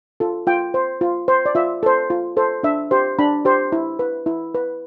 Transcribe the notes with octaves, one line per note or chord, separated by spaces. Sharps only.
F4 A4
F4 G5
C5
F4
C5
D5
F4 E5
A4 C5
F4
A4 C5
D4 E5
G4 C5
D4 B5
G4 C5
E4
B4
E4
B4